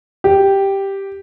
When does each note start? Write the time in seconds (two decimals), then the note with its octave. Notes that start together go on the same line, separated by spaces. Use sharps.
0.24 G4